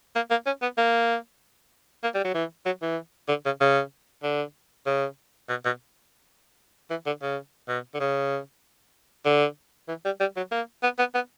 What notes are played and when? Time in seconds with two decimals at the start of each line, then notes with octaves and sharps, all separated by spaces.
0.15 A#3
0.30 A#3
0.46 C#4
0.62 B3
0.77 A#3
2.03 A#3
2.14 G3
2.24 F#3
2.34 E3
2.66 F#3
2.82 E3
3.28 D3
3.45 C#3
3.60 C#3
4.23 D3
4.86 C#3
5.49 B2
5.65 B2
6.90 E3
7.06 D3
7.22 C#3
7.69 B2
7.94 D3
8.00 C#3
9.25 D3
9.88 E3
10.05 G3
10.20 G3
10.36 F#3
10.51 A#3
10.83 B3
10.99 B3
11.15 B3